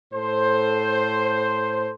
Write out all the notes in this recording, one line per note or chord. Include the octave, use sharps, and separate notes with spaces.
A2 A4 C5